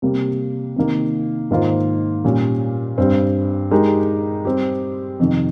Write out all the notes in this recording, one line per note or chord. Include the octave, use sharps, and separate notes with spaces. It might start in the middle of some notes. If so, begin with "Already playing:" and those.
C3 G3 A#3
C3 D#3 A#3
G#2 D#3 A#3 F4 C5
A#2 G3 C#4
G2 G3 C4
G#3 D#4 G4 A#4
G3 C4 G4
F2 C3 D#3